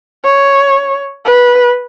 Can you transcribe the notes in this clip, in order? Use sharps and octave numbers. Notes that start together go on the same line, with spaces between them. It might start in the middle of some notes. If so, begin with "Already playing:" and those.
C#5
B4